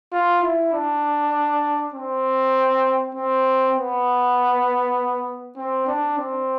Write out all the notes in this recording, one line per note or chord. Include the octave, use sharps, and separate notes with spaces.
F4
E4
D4
C4
C4
B3
C4
D4
C4